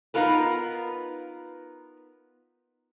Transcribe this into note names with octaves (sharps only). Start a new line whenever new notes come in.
B3 D#4 F4 A#4 B4